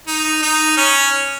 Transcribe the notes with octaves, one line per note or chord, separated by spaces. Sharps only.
D#4
D#4
C#4